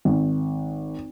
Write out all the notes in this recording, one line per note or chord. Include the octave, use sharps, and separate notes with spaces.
G#1